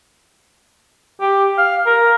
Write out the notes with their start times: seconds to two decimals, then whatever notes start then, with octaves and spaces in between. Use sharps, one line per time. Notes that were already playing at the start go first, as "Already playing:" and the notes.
1.21 G4
1.58 F5
1.87 A#4